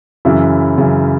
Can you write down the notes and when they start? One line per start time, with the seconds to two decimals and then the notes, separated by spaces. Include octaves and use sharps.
0.25 F#2 C#3 E3 E4
0.78 F#2 C#3 E3